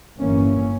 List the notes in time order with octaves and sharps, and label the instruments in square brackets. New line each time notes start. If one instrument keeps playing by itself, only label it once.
[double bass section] G1 G2 E3 A#3 C#4